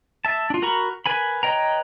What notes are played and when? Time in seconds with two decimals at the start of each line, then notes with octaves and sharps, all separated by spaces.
0.25 E5 A5
0.50 D4 F4
0.62 F#4 A#4 A#5 B5 C#6
1.06 A#4 B4 G#5 B5
1.43 B4 C#5 D#5 G5 A#5